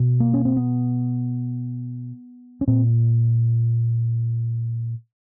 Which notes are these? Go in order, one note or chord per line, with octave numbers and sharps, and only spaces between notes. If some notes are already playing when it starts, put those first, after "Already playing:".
Already playing: B2
A#3
C#4
C4
B3
C#4
A#2 C4